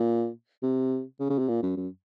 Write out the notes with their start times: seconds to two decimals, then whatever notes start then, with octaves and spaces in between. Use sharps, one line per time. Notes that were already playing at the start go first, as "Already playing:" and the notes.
Already playing: A#2
0.63 C3
1.20 C#3
1.30 C#3
1.39 C3
1.48 A#2
1.63 F#2
1.77 F#2